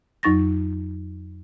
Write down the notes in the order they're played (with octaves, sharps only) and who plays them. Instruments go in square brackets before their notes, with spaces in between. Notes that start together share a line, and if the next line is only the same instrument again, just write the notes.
[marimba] F2 F#3 D#4 C#6 A6 A#6